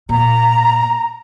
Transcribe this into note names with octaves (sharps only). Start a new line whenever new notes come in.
A#2 A#5